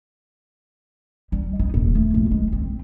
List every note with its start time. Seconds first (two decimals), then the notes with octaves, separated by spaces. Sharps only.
1.32 G3
1.59 D#4
1.74 D#1
1.95 A3
2.14 A#1
2.31 G#3
2.52 C4